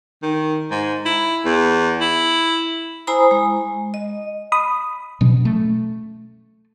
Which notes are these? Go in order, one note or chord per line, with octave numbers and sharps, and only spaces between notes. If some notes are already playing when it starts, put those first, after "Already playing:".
D#3
G#2
E4
E2
E4
E4 C5 G#5 A#5 B5 D#6
G#3
D#5
B5 D#6
B2 F#3 C#4
A3